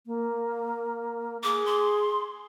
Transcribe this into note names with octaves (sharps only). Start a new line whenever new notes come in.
A#3
G#4 D6
C6